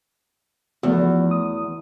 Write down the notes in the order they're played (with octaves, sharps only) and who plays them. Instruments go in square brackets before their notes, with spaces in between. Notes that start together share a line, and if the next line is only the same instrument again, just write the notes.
[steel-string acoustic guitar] E2 [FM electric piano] F3 A3 F#4
[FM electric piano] D#6